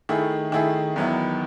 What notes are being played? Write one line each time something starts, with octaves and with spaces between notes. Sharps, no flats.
D#3 A3 E4 G#4
D#3 A3 E4 G#4
E2 D#3 F#3 B3 E4